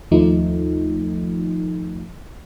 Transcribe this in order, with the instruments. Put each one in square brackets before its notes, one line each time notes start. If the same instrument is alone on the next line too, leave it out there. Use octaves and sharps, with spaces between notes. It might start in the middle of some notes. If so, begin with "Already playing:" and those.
[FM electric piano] D#2 F3 A3 D#4